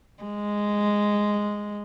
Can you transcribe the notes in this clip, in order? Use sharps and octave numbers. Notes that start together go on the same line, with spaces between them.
G#3